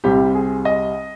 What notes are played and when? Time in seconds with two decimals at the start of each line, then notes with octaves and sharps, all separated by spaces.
0.04 C2 C3 G3 C4 G4
0.35 G#4
0.65 D#5